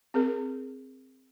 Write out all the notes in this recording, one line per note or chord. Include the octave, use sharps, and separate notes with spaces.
C4 G#4 A#4